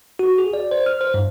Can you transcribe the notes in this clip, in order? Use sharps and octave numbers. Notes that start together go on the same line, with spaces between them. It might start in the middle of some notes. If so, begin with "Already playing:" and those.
F#4
G#4
D5
C5
F6
C5
G2